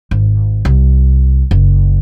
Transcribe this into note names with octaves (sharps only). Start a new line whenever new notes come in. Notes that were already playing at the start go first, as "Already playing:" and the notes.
G#1
C2
F#1